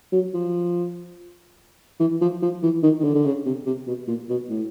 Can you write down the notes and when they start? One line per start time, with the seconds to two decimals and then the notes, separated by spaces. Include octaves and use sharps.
0.13 F#3
0.34 F3
1.99 E3
2.21 F3
2.42 F3
2.63 E3
2.83 D#3
3.00 D#3
3.04 D3
3.15 D3
3.25 C#3
3.46 C3
3.66 C3
3.87 B2
4.07 A#2
4.29 B2
4.49 A2